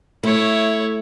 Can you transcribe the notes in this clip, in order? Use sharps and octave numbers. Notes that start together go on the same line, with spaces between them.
A3 E4 C#5